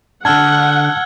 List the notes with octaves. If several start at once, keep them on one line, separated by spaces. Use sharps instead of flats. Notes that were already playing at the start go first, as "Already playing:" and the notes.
D3 D4 F#5 A5 E6 F6 G#6